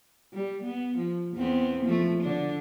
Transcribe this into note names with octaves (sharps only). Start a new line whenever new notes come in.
G3
B3
F3
E2 B3 C4
F3 A3
D3 D4